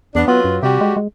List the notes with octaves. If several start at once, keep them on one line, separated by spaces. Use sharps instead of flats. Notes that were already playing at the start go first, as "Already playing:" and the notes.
E2 B3 D4
F#3 B3 F4 B4
F#2
C3 G3 F#4 G4
G#3
G#3